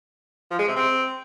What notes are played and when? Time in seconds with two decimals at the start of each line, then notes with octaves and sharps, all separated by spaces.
0.51 F3
0.59 G#3
0.68 C3
0.76 C4